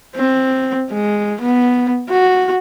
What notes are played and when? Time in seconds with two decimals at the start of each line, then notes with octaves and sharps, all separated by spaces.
0.15 C4
0.91 G#3
1.41 B3
2.09 F#4